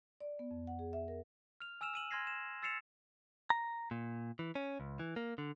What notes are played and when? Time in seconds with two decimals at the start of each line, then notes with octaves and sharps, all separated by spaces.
0.20 D5
0.39 B3
0.51 F2
0.67 F#5
0.79 G#4
0.93 E5
1.08 A#4
1.60 F6 F7
1.81 G#5 E6 F6 E7 F7
1.94 E6 D#7 F#7
2.11 G#5 C6 F6 G#6 A#6 C7
2.27 E7
2.62 E6 A6 C7 C#7 E7 F7
3.50 A#5
3.91 A#2
4.39 E3
4.55 C#4
4.80 C#2
4.99 E3
5.16 A#3
5.38 D3